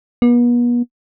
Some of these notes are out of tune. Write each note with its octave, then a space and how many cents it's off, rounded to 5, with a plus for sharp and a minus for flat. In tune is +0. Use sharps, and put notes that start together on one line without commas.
B3 -40